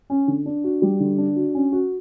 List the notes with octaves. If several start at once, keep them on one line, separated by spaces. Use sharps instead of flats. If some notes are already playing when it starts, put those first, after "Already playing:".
C#4
D3
D4
F#4
G3
D3
D4
F#4
C#4
F#4